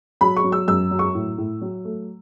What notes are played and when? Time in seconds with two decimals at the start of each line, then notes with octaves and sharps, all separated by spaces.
0.21 F#3 B5
0.37 C#6
0.44 F#3
0.52 E6
0.68 F#2 E6
0.91 F#3
0.99 C#6
1.15 A2
1.38 A2
1.61 F#3
1.85 A3